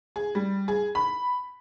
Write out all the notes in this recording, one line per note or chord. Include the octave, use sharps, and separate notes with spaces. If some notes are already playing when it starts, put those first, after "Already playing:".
G#4
G3
G#4
B5